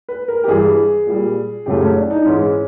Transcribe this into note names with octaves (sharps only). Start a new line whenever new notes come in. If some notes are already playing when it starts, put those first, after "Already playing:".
B4
A#4
G4
G2 E3 G3 G#4
A#2 G3
F#2 C#3 F#3 A3 G4
C#4
D4
D#4
G#2 E3 G#3 C#4